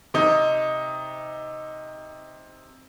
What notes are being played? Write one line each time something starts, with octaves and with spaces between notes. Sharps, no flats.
C3 D#4